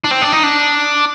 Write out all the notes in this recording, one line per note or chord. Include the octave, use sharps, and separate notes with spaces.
D4
C4
D4
D#4
D4